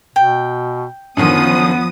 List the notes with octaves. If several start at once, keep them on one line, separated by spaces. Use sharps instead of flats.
B2 G5
F#2 D3 D#3 F3 B3 D#6